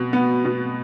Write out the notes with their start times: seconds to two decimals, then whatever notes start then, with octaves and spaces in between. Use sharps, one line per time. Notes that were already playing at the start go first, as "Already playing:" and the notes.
Already playing: B2
0.13 B3
0.45 B2